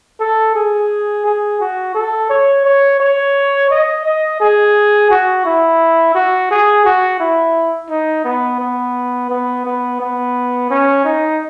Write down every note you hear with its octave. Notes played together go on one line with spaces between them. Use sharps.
A4
G#4
G#4
F#4
A4
C#5
C#5
C#5
D#5
D#5
G#4
F#4
E4
F#4
G#4
F#4
E4
D#4
B3
B3
B3
B3
B3
C#4
D#4